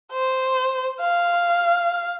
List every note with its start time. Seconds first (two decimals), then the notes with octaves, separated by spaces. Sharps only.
0.13 C5
1.01 F5